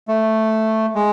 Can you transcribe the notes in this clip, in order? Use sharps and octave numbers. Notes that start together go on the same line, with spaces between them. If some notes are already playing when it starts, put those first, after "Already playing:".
A3
G#3